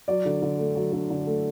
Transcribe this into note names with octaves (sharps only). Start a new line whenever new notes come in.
F#3 D5
D3
D3
A3
F#3
D3
D3
A3